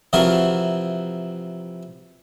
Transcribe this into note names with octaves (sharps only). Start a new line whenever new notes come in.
C3 E3 F3 F#4 A#4